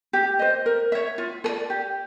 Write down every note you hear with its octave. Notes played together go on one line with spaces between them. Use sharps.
G4
C5 D#5
A#4
C#5 E5
F4
A4
D5
G4